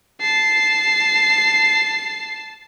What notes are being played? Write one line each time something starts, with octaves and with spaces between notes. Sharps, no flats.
A5 C7